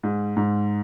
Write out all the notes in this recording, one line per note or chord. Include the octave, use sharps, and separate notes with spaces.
G#2
G#2